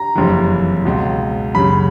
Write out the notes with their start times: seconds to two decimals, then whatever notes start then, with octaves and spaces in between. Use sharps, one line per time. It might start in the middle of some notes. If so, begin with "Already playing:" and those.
Already playing: A#5
0.15 F#1 F2 C3 E3
0.85 C#2 B2
1.55 F#1 F#2 C#3 B5